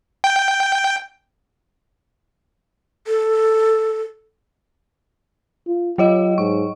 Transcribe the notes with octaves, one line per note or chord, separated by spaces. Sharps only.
G5
A4
F4
F#3 F4 C#5 D#5
G#2 C#6